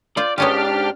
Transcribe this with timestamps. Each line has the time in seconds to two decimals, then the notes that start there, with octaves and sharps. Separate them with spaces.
0.17 F4 C5 D5
0.38 G#2 B3 C#4 D4 F4 G4 F6